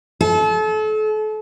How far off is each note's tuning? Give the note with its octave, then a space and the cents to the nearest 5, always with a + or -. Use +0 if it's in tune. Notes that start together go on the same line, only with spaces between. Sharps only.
A4 -35